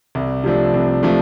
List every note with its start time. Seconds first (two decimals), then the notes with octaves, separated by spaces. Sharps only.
0.15 C2
0.44 C3 F3 A3 D4
0.74 C2
1.03 C3 F3 A3 D4